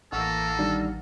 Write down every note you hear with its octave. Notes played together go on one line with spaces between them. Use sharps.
A1 E3 A#3 A4 F#5 C#6 E6 F6
D#3 G3 D4